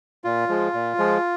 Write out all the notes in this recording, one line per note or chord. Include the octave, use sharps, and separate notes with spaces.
A#2 F4
F3 G#3
A#2
F3 G#3